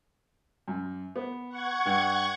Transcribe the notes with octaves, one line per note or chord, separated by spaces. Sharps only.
F#2
B3
F#5 C#6 G#6
G2